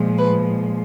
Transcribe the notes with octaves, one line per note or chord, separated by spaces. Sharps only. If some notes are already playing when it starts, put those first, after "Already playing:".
Already playing: A#2 F3 G#3
B4